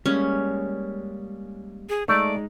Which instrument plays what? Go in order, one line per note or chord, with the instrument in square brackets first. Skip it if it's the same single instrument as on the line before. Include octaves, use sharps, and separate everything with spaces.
[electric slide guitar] G3 G#3 A#3 [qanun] C#4
[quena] G#4
[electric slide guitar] G#3 D#4 [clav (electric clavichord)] A3 [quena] D5